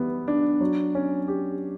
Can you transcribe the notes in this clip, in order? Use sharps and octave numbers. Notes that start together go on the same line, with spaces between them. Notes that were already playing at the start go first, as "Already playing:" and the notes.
Already playing: E3 G3 B3
D4
F#3
C#4
G4